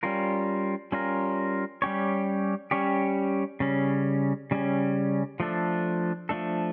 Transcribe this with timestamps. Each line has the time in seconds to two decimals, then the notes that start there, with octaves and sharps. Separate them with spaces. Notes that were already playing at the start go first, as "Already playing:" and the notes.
0.03 G3 C#4 F4 A#4
0.92 G3 C#4 F4 A#4
1.82 G3 C#4 G4 C#5
2.71 G3 C#4 G4 C#5
3.60 C#3 G3 C#4
4.51 C#3 G3 C#4
5.40 F3 A3 D4 A4
6.29 F3 A3 D4 A4